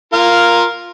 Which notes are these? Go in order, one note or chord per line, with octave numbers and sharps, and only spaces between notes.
F4 A#4 F5